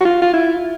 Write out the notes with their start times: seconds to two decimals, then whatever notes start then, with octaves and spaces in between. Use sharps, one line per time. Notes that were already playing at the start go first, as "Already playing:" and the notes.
0.01 F#4
0.05 F4
0.22 F4
0.33 E4